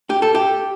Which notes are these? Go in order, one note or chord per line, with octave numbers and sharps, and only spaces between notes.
G4
A4
G4